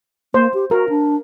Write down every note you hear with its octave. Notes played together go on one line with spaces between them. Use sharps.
A#3 C5
G4
F#4 A#4
D4